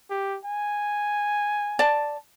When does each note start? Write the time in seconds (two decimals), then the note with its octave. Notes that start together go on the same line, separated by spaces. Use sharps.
0.10 G4
0.45 G#5
1.79 D5 A5